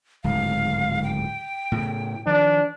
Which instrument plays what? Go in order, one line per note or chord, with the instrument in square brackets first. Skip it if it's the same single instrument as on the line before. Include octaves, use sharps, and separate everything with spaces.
[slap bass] D1 G#2 C#3 [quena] F5
[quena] G5
[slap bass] A2 C#3
[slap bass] D#3 F3 [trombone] D4